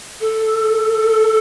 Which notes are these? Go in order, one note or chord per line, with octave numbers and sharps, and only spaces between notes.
A4